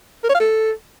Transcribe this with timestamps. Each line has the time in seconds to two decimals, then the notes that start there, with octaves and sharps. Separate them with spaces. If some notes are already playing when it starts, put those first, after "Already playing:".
0.24 A#4
0.29 C#5
0.34 F5
0.40 A4